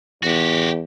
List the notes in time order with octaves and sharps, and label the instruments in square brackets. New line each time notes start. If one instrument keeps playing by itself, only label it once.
[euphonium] E2 [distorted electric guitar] F#4 G4